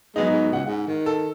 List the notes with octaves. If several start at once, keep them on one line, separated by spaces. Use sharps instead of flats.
F#3 G#3 B3 D#4
G#2
C#2 F#5
G#2
D#3
A4